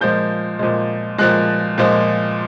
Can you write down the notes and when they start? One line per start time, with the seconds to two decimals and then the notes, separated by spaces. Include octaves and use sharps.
0.01 A#2 F3 G#3 G6
0.59 A#2 F3 G#3
1.18 A#2 F3 G#3 F#6
1.78 A#2 F3 G#3